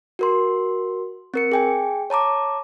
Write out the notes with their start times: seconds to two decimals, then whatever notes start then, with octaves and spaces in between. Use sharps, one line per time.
0.19 F#4 A#4 C6
1.34 C4 A#4 C#7
1.52 G#4 G5 G#5
2.10 C#5 A5 A#5 D6